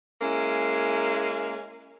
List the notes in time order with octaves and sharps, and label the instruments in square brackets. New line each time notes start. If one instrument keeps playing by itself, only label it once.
[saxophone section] G#3 A#3 C#4 E4